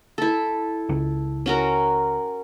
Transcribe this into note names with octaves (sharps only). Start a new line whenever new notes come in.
E4 A4
C#2
C#4 F#4 A#4